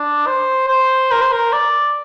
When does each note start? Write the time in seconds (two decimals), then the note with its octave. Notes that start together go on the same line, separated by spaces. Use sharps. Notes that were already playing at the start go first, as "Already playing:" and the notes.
Already playing: D4
0.27 C5
0.68 C5
1.12 A#4
1.22 C5
1.33 A#4
1.53 D5